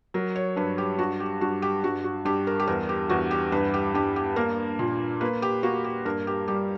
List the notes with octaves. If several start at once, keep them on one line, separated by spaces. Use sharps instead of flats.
F#3 A#4
C#5
G2 B4
G4
G2 F#4
G4
G2 F#4
G4
G2 F#4
F#4
G2 G4
A#4
G4
E2 A#4
G4
E2 F#4
G4
G2 B4
G4
G2 G4
G4
A#3 A#4
A#2
A#3 B4
G4
A#3 F#4
G4
G2 A#4
G4
G3 G4